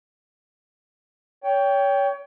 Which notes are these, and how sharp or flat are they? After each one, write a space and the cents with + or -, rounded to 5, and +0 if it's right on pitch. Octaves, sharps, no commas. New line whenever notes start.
C#5 +30 G5 +5